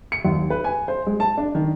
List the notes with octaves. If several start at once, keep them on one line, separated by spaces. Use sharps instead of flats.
C#7
D#2
B4
G#5
C5
G#3
A5
D4
D#3